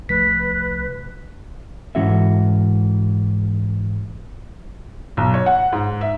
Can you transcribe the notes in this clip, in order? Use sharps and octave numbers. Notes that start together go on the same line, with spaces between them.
C2 F3 A3 B4 B6
G#2 E3 C#4 F#4 A4 E5
B1
C#5
F#5
G#2
E5